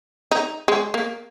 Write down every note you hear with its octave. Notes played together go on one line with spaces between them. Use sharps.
D#4
G#3
A#3